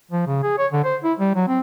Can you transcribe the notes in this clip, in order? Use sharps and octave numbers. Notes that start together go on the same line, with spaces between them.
F3
C#3
G#4
C#5
D3
C5
E4
G3
F#3
C4